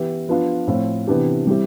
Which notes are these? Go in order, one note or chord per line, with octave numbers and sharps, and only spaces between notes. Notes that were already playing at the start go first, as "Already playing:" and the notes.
Already playing: E3 B3 E4 G4
F3 B3 D4 F4
A2 F3 C4 F4
C3 E3 B3 D4 G4
G3 C4 E4 G4